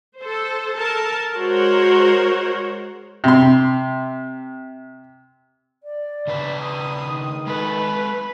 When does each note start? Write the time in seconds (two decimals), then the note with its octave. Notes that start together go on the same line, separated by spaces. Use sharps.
0.19 A4 C5
0.77 A4 A#4 A5
1.37 G#3 F#4 A#4 C5 C#5
3.24 C3 C6
5.83 D5
6.27 C#3 D4 B4
6.62 D#6
7.01 D#3
7.47 G#3 A4 B4